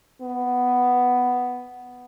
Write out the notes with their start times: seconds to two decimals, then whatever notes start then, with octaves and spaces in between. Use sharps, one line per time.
0.22 B3